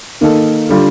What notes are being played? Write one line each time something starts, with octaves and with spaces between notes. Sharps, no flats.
D#3 A#3 D#4 A4
D3 G3 D4 F4